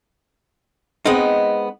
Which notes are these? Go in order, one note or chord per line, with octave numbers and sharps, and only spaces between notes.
G#3 B3 C4 D#4